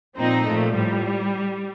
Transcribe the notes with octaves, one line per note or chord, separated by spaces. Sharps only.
A#2 F3 C4 D#4
A#2 F3 A3
A2 F3 G3